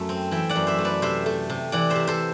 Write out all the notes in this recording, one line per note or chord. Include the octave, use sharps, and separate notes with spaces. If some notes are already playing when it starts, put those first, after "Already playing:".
Already playing: F#2 A3 E5
C4
E3 E5 G5
D5 F#5
F#2
C5 E5
A3
B4 D5
C3 C5 E5
A3
C3
E3 D5 F#5
C5 E5
C3
A4 C5